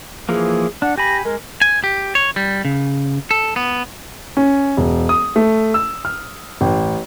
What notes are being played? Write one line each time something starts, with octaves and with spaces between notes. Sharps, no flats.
E3 F3 A#3 G#4
D4 F#5
G4 G#5 B5 A#6
G#3 A#4
G#5
G4
C#5
G3
C#3
A4
B3
C#4
E1
D#6
A3
E6
F6
A1